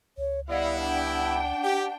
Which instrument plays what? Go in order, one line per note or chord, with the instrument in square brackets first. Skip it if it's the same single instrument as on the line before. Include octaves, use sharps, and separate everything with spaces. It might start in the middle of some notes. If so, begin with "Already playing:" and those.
[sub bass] C#2 [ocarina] C#5
[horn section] G3 B3 E4 [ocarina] D5 [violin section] D#5 F5 F#5
[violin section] D4 G5 [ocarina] F#5
[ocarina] F#5
[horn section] G4